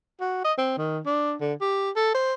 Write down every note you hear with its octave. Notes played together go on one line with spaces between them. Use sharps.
F#4
D#5
C4
D#3
D4
D3
G4
A4
C5